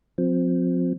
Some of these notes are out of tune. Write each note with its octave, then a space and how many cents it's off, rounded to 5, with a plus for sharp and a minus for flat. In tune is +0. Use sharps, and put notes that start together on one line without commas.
F3 +35 C4 -5